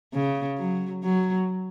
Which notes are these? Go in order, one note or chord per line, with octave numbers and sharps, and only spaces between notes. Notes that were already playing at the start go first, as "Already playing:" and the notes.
C#3
F#3
F#3